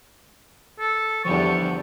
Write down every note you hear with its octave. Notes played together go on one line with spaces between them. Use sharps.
A4
E2 D3 F3 G3 C#6